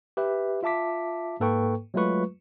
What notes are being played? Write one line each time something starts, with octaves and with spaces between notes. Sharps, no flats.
G4 B4 E5
F4 E5 A5 D6 B6
G#2 A#3 A4 B4 G5 C#6
F#3 G#3 A3 F4 B4 C#6